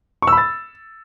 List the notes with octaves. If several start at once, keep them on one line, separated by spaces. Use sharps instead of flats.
C#6
E6
B5
A6